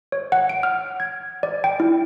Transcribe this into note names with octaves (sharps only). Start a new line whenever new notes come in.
C#5
F#5
D7
F6
G#6
D5
G5
E4